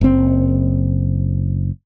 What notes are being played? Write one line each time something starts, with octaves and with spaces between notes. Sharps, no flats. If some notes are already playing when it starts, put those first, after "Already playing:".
F#1 C4